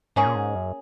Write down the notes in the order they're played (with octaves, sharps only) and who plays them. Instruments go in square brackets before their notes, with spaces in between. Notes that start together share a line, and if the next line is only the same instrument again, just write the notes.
[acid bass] G#2 [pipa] A#3 C#4 G#4
[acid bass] A#2
G#2
F#2